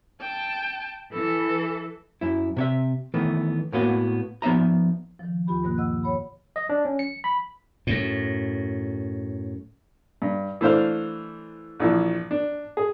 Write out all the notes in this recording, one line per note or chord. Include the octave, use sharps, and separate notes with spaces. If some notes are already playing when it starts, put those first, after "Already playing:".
G5 A5
E3 A4
F#2 E4
C3 C#5 E5
D#3 E3 A3 B3
A2 A#3 B3 F#4 F5
F3 B3 D#4 E5 A#5
D#3 F3
D#2 F4 G4 B5
G2 B2 D#3 A#3 F#6
D#5 F#5 E6
C#5 F#5 B5
D#5
D4
C#4
C#7
B5
F#2 A2
G2
E3 A3 D4 C5 F5 F6
A#1 E3 F3
D4
G#4